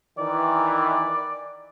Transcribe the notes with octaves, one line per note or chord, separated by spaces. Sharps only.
D#3 E3 D5